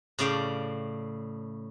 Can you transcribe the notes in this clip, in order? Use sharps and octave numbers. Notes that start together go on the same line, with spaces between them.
A2 C#3 D5 F5 G5